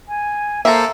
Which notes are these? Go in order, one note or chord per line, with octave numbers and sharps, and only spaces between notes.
G#5
A#3 A4 C5 E5 A#5